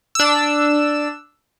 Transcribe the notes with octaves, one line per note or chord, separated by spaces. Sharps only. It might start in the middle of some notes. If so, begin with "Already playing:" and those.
D4 E6